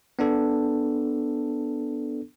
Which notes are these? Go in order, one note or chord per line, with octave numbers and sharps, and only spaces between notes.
B3 D4 A4